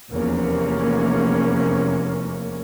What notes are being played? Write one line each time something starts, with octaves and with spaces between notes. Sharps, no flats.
F1 E2 C3 A#3 C#4